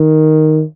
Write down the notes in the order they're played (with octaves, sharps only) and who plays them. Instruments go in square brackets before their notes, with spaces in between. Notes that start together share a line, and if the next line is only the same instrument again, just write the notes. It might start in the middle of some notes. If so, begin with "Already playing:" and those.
Already playing: [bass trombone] D#3